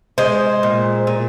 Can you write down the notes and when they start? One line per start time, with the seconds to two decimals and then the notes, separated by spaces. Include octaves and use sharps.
0.18 G#3 C5
0.63 A#2
1.07 A#2